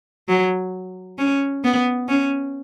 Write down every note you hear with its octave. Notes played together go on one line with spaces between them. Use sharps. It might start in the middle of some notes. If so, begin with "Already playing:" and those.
F#3
C#4
B3
C#4